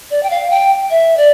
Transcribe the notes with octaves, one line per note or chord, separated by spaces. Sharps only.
D5
G5
F5
G5
E5
D5